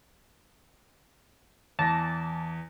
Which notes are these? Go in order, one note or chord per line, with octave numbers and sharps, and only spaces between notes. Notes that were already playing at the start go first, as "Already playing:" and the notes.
E2 E3 A5 A#6